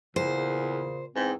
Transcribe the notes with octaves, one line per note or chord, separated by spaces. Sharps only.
E2 A#2 C#3 C5
E2 G#2 C4